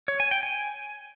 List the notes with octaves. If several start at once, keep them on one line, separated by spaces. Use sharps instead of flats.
C#5
G#5
G5
G#5